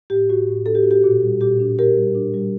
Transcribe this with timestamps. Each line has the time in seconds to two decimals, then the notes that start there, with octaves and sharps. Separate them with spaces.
0.10 A2 G4
0.29 A2 F#4
0.48 A2
0.66 D4 A4
0.75 G4
0.83 D4 F#4
0.91 G4
1.03 A#2 F#4
1.22 G3
1.41 A#2 G4
1.60 D4
1.78 D4 G4 A#4
1.96 G3
2.15 D4
2.34 G3